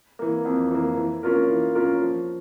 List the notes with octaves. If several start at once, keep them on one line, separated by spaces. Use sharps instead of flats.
E3 A#3
F2
E3 A#3
E3
A#3 C#4 F4 A#4
E3
A#3 C#4 F4 A#4
F3